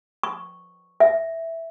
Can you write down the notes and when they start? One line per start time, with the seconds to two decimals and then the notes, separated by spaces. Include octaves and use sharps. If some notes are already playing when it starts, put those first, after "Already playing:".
0.23 C#6
1.00 E5